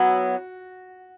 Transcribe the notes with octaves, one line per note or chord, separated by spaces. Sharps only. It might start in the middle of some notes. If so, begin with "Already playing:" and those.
Already playing: F#3 B3 E4 F#4